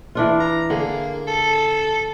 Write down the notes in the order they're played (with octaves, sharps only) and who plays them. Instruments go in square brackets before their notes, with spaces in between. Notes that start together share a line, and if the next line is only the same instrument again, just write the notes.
[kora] E3 D4 F4
[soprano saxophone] A#5
[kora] D3 G#4 [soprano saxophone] A#3
[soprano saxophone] A4